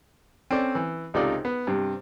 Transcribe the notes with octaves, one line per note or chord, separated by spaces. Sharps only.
C4 C#4 A4 D5
E3
C#2 C3 D#4 F4 A4 D5
B3
G2 C3